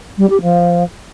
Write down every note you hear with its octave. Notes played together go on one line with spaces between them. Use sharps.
G3
G4
F3